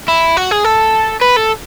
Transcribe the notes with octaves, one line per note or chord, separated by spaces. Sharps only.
E4
F#4
G#4
A4
B4
A4